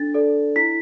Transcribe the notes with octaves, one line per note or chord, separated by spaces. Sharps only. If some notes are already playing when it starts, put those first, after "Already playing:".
Already playing: D4 A4 A6
A4 D5
E4 B6